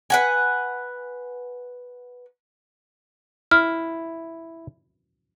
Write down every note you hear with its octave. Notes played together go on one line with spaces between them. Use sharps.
B4 F#5 G#5
E4 F6